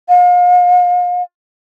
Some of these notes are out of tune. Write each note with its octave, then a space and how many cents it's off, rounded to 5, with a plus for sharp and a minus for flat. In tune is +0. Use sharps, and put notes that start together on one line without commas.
F5 +40